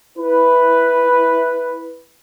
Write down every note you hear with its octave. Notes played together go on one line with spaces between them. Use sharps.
E4 B4